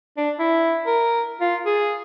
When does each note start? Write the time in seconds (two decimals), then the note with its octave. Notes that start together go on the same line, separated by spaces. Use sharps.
0.17 D4
0.39 E4
0.87 A#4
1.41 F4
1.66 G#4